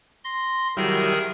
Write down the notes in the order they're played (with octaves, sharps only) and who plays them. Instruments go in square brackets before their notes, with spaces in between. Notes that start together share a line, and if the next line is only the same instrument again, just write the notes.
[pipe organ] C6 A#6
[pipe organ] D#3 G#4 A#4 [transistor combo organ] F#3 G3 E4